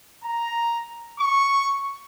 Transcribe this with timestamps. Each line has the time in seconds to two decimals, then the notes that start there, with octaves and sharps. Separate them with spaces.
0.22 A#5
1.18 C#6